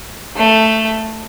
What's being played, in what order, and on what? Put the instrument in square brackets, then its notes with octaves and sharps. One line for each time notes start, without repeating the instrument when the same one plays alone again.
[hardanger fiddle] A3